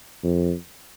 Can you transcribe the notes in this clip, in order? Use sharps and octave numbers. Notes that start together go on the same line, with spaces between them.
F2